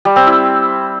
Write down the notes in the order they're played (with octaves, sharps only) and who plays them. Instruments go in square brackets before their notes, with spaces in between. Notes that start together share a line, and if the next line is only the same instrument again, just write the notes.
[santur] G3
C4
E4